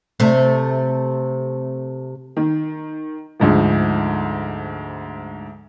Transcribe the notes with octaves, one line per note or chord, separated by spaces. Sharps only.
C3 A3
D#3
D2 G#2 F3